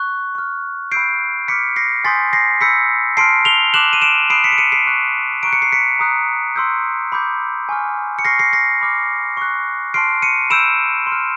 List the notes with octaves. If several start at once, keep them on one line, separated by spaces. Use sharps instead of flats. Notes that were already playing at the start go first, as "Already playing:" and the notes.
Already playing: C#6 F#6
C#6 F6
B5 E6 G6 C7 D7
B5 D6 F6 B6 C#7
A#6 C7
G#5 C6 D#6 G6 A6 B6
A#6 C7
B5 E6 G6 B6 C#7
A5 C6 F6 C7 D7
F7 G7
A5 D6 F#6 E7 F#7
D#7
D7 E7
B5 D#6 F#6 C7 D7
B6 C#7
D7
C#7 D#7
C7 D7
C#6 F#6
A#5 C#6 F#6 D7
C#7
C7
B6 C#7
A#5 D#6 F#6
C6 E6 G6
B5 D6 G6
G#5 C#6 F6
C#7
C#6 F6 A#6 C7
A#6 C7
A#6 C7
B5 D6 F6
C#6 F#6
A5 C6 F6 C7 D7
C#7 D#7
B5 E6 G6 D7 E7
C6
F6